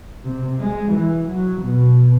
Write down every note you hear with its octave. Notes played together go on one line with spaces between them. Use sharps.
C3
G#3
E3
F#3
B2